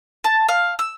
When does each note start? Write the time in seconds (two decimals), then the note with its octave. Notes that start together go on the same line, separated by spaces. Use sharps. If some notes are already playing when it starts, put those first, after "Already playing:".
0.24 A5
0.49 F5
0.79 E6